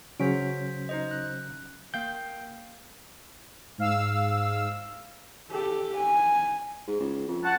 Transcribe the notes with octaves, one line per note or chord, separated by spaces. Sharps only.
C#3 F#3 C#4 C5 B6 D7
D#4 C5 D#5
F#6
A#3 F5 G5 G6
G#2 F5 E6
G4 A4
G#5
G#2
C#2
F2
F#5 A5